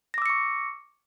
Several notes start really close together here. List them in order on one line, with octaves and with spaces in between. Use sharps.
A#6 D6 E6 C#7 C#6